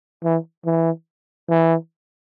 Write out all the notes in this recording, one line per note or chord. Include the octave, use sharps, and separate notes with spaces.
E3
E3
E3